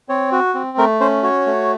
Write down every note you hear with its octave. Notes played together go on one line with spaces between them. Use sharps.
C4 C#5
F#4
C4
A3 A#4
C#4 C5
F#4 C#5
A3